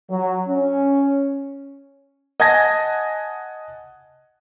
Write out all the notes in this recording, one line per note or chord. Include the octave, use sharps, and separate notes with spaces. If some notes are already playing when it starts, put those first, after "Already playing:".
F#3
C#4
D#5 F#5 G#5 A5 G#6 A#6